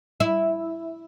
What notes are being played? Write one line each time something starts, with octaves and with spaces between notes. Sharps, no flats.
E4